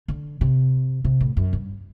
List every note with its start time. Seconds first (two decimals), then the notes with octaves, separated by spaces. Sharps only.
0.08 D3
0.41 C3
1.04 C3
1.21 A2
1.37 F#2
1.53 G2